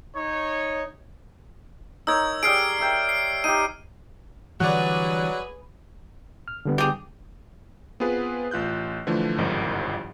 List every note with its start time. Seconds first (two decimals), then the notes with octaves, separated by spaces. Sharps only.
0.15 D#4 C#5
2.07 D#4 A#4 C#5 E6 G#6
2.43 G3 G#4 F6 C7 D7
2.80 A#4 E5 G5
3.09 C7
3.44 D#4 G4 D#7
4.60 D3 E3 F#3 G3 F#4 G#4 B4 D5
6.48 F6
6.65 D3 G3 B3
6.78 G4 G#4
8.00 B3 C4 F4 G#4 B4
8.51 A1 F4 F#6 G6
9.07 D3 E3 F3 A3
9.38 G1 C2 F2 G#2 D#3 F3